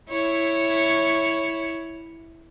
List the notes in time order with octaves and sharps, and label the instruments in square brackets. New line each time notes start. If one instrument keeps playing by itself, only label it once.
[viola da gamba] E4 C#5